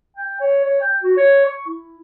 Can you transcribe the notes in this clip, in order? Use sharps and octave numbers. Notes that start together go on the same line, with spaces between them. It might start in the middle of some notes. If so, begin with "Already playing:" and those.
G5
C#5
C#5
G5
F#4
C#5
C#6
E4